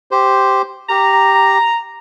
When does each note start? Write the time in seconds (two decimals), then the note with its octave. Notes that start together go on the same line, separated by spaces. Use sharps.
0.11 G4 C5
0.90 G4 A#5